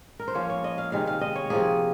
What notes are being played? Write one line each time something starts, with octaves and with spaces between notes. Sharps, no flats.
A#4
C5
F3 A#3 C#4 C#5
C#5
D#5
F5
C3 D#3 G#3 F5
F5
D#5
C#5
C3 F3 A#3 G#4